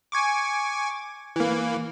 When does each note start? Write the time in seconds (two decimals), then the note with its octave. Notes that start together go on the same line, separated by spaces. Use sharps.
0.12 G#5 C#6 D6
1.36 E3 A#3